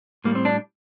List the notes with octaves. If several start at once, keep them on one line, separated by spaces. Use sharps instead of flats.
A2 G3 A#3
C4
D4